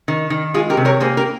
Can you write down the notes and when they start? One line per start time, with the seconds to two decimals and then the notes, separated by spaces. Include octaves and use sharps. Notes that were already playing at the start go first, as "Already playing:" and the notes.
0.08 D#3
0.30 D#3
0.54 G#3 F4 G#4
0.70 G4 A#4
0.77 C3
0.85 A#4 C#5
1.00 A#3 G#4 C5
1.17 G4 A#4